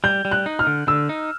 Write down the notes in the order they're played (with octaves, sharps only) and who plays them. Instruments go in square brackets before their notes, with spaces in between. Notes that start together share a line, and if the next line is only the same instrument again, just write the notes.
[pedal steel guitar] G3 [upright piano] G6
[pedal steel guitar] G3
[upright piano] F#6
[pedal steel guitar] D#4
[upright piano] F6
[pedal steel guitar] D3
[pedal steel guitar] D3 [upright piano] E6
[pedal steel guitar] D#4